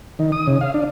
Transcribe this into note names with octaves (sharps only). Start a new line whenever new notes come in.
D#3
D#6
C#3
F5
D4